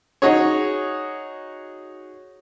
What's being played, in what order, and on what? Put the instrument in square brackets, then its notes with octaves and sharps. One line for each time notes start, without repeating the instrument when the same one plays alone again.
[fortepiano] D#4 F#4 G#4 C#5